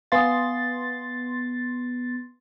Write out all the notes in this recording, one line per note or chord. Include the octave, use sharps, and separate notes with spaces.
B3 F5 G#5 C6 D#6 A6